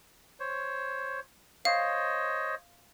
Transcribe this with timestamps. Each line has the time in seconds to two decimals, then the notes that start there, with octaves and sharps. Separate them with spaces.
0.40 C5 C#5
1.65 C5 C#5 D#5 F5